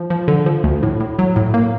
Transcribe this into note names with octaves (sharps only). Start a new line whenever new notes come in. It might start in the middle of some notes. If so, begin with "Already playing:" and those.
Already playing: F3
F3
D3
F3
D2
A2
A2
F#3
A2
A#3